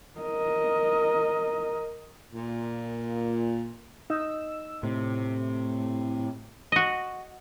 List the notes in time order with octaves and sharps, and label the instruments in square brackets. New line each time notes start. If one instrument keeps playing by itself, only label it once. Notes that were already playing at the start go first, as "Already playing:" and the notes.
[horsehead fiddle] A#4 D#5
[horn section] A#2
[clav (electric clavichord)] D#4 [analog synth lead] E6
[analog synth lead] A2 [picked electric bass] C3
[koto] F#4 D#5